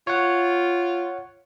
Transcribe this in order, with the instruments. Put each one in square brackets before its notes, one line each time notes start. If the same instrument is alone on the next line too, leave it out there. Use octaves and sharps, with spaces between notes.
[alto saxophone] F4 [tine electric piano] C#5 F#5